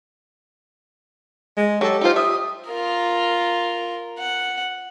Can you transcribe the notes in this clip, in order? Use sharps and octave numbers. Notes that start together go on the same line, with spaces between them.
G#3
F#3 G4 A4
D#4 F4 C5
E5 D#6
F4 A#4
F#5